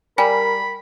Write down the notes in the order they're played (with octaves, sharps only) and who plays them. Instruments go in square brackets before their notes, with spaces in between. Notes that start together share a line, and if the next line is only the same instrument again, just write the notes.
[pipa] G3 [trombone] A#4 [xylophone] G#5 [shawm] B5